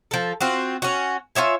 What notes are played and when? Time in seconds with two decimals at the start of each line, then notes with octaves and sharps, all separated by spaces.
0.11 F3 A4
0.41 C4 F4 F#4
0.82 C#4 F#4
1.35 F4 C#5 E5 G#5